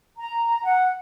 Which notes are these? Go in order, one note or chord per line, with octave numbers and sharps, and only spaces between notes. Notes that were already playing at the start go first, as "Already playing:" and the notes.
A#5
F#5